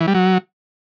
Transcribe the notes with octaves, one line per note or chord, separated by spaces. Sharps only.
E3
G3
F#3